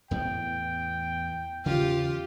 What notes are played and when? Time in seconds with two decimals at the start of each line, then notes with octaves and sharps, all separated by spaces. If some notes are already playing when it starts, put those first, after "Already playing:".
0.11 E2 A2 B3 G5
1.66 E2 C#3 F4 G4